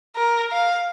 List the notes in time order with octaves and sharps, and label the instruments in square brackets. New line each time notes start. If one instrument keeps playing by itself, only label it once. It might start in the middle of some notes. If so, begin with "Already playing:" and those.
[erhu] A#4
F5